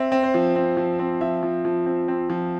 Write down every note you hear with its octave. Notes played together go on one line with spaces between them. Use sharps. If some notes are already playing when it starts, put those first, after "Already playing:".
Already playing: C4 E5
C4
C5
F3
C4
F3
C4
F3 E5
F3
F3
C4
C4
F3